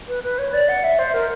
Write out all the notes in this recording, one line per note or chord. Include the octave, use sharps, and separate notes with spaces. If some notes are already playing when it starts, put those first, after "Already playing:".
B4
B4
C#5
D5
F#5
E5
C5
A#4